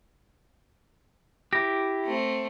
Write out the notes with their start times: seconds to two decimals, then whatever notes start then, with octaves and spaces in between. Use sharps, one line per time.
1.53 E4 G4 A#6
2.05 A3 C4